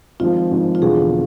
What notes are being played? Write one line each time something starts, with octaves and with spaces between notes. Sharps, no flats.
G#1 G#2 F3 F4
G#1 G#2 F3
F4
E1 E2 D3 F3 G#4